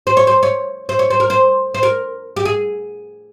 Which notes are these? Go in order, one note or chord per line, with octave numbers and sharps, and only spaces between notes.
C5
C#5
C5
C#5
C5
C#5
C5
A#4
C5
C5
A#4
G4
G#4